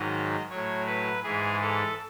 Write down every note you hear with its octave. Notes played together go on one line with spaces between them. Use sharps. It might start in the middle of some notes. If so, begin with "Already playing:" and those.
Already playing: G#2 D#3 F#3 D#5
A2 F#3 C#5
B4
G#2 E3 G#4
A4